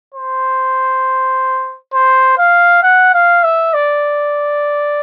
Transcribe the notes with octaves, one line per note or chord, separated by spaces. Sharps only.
C5
C5
F5
F#5
F5
E5
D5